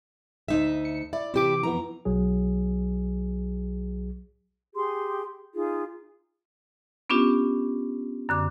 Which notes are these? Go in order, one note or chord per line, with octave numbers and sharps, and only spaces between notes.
D2 D#4 E5
C#7
E4 D5
C3 E3 E4 G4 D6
F2 E3 B3 A#5
B1 F#3 G#4
G4 G#4 C6
D#4 F4 G#4
B3 C#4 D4 F4 G4
F#2 D3 D6